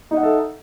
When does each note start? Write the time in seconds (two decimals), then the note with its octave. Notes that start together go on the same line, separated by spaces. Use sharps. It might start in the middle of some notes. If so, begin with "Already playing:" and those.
0.11 D#4
0.14 D#5
0.17 F#5
0.20 E5
0.23 A4